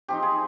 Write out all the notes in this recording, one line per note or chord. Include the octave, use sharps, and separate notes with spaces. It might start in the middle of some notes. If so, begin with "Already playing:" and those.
F3 C4 D#4 G4
G#4